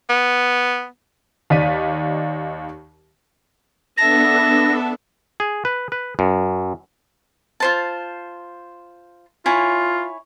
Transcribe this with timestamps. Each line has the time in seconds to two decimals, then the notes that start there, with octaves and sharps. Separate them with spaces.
0.10 B3
1.50 D#2 D#4 D5 B6 D#7
3.97 B3 D4 A4 E5 A5 A#6
5.40 G#4
5.65 B4
5.92 B4
6.19 F#2
7.60 F4 C5 A5
9.46 E4 F4 C#5 G#5